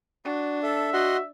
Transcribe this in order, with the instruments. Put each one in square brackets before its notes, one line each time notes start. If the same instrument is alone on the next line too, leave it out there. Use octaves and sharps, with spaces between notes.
[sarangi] D4 [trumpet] F#4
[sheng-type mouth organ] A4 [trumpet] E5
[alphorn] F#4 [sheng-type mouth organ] D#5 F#5 C6